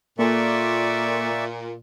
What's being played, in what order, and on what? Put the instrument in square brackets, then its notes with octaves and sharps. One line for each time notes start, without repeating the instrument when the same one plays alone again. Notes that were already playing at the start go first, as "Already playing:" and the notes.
[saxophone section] A#2 [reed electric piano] A#3 F4 A4 [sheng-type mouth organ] D5 E5 C#6